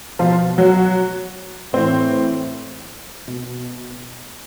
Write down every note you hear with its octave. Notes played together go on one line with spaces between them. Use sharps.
B2 F3 F4
F#3 F#4
A2 E3 C4
B2